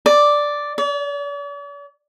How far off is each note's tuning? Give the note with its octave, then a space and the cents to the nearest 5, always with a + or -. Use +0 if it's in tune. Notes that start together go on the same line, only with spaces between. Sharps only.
D5 +0
D5 -45